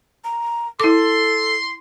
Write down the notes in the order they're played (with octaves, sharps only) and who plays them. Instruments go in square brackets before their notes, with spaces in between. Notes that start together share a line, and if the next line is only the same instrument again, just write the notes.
[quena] A#5
[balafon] E4 D6 [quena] A4 [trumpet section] C6